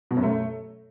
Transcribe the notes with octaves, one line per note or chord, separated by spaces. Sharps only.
B2
F#2
A3